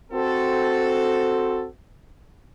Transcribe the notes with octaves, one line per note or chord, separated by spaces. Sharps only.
C4 F#4 A4